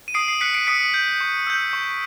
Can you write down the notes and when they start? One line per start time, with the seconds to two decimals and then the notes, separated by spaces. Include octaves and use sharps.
0.08 D#7
0.14 D#6 C7 D7
0.28 C7
0.41 F#6 B6 C#7
0.55 C7 D7
0.67 D#6 B6 C#7
0.94 G6
1.21 C#6
1.47 E6 G6
1.73 C#6